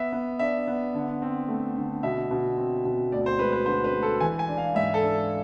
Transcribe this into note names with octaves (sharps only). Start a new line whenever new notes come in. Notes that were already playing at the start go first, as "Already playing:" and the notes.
Already playing: B3 E5
B3
D4 E5
B3
D3
C4
A3
D3
B2 E5
B2
C4
B2
D2 D5
C5
G#3 B4
B4
D3 C5
B4
G#3
A4
E3 G#5
G#5
D4
F5
G#2 E5
A4
D4